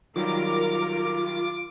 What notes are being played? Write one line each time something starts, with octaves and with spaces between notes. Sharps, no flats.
D#3 F#3 G3 F4 A#4 D6